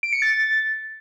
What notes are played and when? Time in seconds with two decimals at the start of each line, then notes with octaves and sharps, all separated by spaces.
0.03 D7
0.13 C#7
0.22 A6